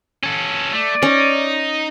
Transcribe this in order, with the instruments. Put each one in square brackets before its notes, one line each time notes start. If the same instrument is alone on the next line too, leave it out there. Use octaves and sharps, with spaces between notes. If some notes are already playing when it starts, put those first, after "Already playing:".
[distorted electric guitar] C#4 A4
[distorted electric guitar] A3 [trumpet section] D5
[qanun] C#4 [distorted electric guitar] D#4